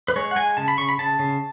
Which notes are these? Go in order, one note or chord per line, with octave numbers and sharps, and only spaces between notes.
B4
G#3 C#5
F#5
G#3 G#5
C#3 A5
B5
C#3 C#6
B5
C#3 A5
C#3